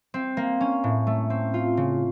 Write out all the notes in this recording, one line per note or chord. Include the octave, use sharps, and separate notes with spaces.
C4
A#3
C#4
A2
A3
C4
F4
C#3